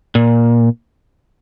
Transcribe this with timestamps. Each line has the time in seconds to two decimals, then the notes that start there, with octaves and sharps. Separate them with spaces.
0.15 A#2